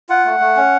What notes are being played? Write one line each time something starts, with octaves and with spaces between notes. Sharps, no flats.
F4 F#5
A3
A3
C#4